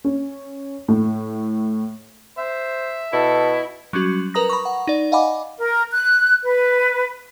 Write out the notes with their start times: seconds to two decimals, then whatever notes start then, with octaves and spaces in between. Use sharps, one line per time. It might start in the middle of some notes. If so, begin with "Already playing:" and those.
0.04 C#4
0.88 A2
2.38 C5 E5
3.13 B2 E4 A4
3.93 F#3 G3 C#4 F#4
4.34 A#4 B4 A#5 D#6 A#6
4.50 B5 C#6
4.65 F#5
4.87 D#4 D5
5.12 D#5 F5 F#5 G#5 B5 D6
5.59 A#4
5.92 F#6
6.44 B4